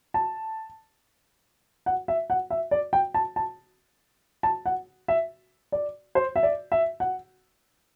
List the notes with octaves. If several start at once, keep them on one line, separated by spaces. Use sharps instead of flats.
A5
F#5
E5
F#5
E5
D5
G5
A5
A5
A5
F#5
E5
D5
C5
E5
D5
E5
F#5